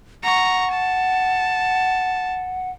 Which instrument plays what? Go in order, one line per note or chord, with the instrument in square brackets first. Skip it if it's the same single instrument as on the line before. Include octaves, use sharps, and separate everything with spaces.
[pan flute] F#5 [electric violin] A#5 C#6
[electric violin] A5